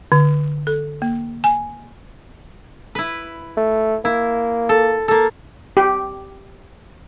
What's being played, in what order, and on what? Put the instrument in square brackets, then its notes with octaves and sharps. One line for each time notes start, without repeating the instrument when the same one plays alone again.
[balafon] D3
A4
A#3
G#5
[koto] E4 B4
[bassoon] A3
[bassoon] A#3 [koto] E4
[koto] A4
A#3 A4
[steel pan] G4